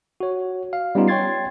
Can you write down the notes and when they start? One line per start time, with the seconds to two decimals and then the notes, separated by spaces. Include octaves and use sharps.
0.20 F#4 C#5
0.73 F5
0.95 G3 B3 C#4 D#4 F4
1.08 C#5 G5 C6 G#6 A6 C7